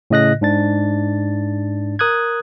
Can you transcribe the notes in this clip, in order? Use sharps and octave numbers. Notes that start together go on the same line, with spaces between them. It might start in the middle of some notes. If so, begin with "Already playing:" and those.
A2 C#3 D#5 F#6 A#6
G#2 D4 A6
A#4 D#6 F#6 G#6